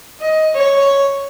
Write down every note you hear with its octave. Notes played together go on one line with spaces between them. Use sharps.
D#5
C#5